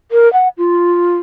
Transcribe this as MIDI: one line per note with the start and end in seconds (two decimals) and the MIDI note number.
0.12 0.31 70
0.33 0.48 78
0.58 1.17 65